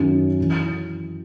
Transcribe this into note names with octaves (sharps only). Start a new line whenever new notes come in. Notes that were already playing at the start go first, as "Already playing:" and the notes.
Already playing: F#2 D#3 F#3 C#4
E3